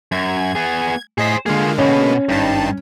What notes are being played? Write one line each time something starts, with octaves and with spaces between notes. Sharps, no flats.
F#2 G#6
B3 G#4
A2 G#4 C5 D#5 B6
D3 G#3 A#3 F4 G#4
B2 B3 C#4
G#1 G2 D#4 A5